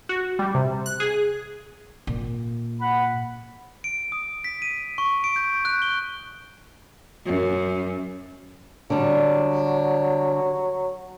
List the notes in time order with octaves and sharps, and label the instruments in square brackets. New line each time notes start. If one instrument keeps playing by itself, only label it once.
[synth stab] F#4
G3
C3
F#6
G#4
[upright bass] A#2
[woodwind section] F#5 B5
[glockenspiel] D7
D#6
B6
D#7
C#6
D7
G6
F#6
G7
[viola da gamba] F#2
[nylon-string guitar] D3 G3 [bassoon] F#3